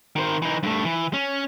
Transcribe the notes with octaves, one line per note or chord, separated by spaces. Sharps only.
D#3 C5
E3 D#4
G2 A3
E3
C#4